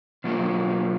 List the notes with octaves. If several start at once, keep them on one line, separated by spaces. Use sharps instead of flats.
B2 F#3 A#3 F4